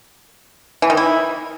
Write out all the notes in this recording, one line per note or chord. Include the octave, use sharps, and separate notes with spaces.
E3
D#3
E4